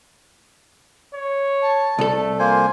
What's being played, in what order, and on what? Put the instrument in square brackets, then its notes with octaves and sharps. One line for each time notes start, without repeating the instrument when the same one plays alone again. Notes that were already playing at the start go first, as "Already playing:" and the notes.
[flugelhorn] C#5
[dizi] A5
[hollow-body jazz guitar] C2 A4 [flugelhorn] A3
[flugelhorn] F3 [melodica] A#3 C5 G#5